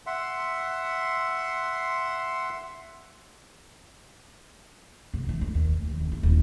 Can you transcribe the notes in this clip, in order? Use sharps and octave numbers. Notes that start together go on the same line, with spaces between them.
E5 F#5 C6
F1
E3
D2
D#2
D2
D#2
F#1
E4
D#1